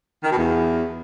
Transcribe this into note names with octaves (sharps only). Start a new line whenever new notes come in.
D#3
B2
E2